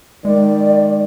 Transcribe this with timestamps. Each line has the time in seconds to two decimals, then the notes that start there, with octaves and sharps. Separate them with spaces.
0.25 D#3 G#3 D5